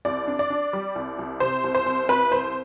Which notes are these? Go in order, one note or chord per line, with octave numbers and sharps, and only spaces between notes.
C2 D5
D4
D5
D4
G3
C2
C2
C3 C5
C2
C5
C2
C2 B4
C2 C5